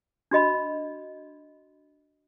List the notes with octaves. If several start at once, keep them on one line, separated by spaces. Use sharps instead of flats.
D4 F#4 D#5 B5